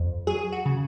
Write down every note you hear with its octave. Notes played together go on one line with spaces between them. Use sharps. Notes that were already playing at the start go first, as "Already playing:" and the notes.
Already playing: F2
F#3 G#4
F#4
C#3